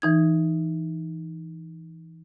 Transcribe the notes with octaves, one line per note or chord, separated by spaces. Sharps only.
E3 D#4 G#6